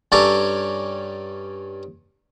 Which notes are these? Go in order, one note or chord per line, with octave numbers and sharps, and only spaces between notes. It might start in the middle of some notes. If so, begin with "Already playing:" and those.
G2 C#4 A4 C#5 D5 A#5